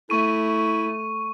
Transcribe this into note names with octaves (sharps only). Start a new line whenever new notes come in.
A3 E4 C#6 D#7